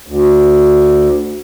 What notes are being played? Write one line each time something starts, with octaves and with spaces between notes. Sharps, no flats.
D2